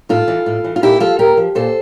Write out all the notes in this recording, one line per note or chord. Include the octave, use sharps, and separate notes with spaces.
A2 F4 A4
E3
A2
E3
F4
A#2 E4 G4
F3 F4 A4
A#2 G4 A#4
F3
A#2 A4 C5